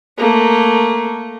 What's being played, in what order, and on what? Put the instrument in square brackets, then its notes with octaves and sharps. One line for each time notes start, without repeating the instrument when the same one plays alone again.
[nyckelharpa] A3 A#3